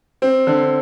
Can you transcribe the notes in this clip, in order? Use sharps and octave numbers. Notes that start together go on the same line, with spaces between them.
C4
D3